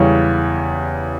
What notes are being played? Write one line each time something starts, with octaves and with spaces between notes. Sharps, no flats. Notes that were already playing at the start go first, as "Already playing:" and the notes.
Already playing: E2 C#3 G3 C#5